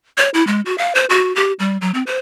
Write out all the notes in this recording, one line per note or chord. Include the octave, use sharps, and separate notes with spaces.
C#5
E4
G#3
F#4
F5
C5
F#4
G4
G3
F#3
C4
C5